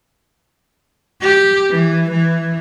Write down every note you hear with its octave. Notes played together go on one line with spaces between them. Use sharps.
G4
E3
E3